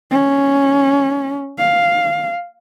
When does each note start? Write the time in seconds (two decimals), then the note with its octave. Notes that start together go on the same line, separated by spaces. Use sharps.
0.11 C#4
1.59 F5